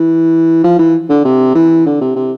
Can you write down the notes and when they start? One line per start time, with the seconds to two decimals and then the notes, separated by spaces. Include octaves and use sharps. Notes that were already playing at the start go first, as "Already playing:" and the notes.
Already playing: E3
0.64 F3
0.79 E3
1.10 D3
1.25 C3
1.55 E3
1.86 D3
2.01 C3
2.16 C3